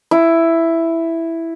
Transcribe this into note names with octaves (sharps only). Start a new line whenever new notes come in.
E4